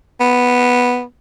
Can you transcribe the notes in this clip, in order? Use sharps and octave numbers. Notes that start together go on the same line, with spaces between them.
B3